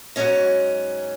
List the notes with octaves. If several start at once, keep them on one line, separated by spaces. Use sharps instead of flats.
G#2 F#3 C#4 D#5